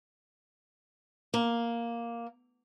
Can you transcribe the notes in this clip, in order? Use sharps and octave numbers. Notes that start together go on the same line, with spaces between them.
A#3